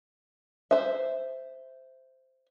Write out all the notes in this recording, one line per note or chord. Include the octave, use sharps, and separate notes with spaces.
C5 E5